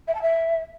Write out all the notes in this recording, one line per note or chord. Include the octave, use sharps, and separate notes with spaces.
E5
A5
E5